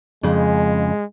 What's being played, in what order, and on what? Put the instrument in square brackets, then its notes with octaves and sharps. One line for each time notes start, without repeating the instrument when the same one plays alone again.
[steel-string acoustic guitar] F2 C#3 [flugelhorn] G#3